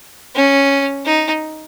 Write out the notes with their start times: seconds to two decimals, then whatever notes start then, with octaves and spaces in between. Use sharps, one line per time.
0.35 C#4
1.05 D#4